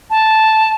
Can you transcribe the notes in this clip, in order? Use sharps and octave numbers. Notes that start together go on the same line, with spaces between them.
A5